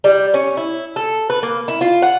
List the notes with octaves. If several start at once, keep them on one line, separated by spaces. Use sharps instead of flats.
G3
C#4
E4
A4
B4
A#3
E4
F4
F#5